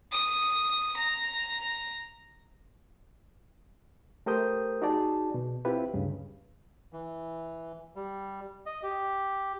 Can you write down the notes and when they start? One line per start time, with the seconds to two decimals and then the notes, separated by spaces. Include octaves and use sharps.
0.12 D#6
0.97 A#5
4.26 A3 G4 A#4 C5 D#6 G6
4.82 D#4 F#4 G#4 D5 A5
5.34 B2
5.65 C4 E4 F4 G4 B4
5.94 D2 G2 C#3
6.93 E3
7.96 G3
8.66 D#5
8.83 G4